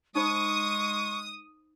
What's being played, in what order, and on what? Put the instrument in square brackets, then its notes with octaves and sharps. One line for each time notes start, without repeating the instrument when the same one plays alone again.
[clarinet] G#3 [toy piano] D#4 C5 B5 [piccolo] C#6 [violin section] D#6